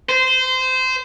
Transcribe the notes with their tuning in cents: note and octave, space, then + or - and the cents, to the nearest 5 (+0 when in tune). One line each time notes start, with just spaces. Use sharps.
C5 -20